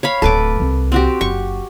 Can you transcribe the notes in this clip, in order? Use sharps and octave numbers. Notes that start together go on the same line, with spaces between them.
C#5 F5 B5
D1 A3 A4 B4 D6
C2
C4 F#4 G4
F#1 C#6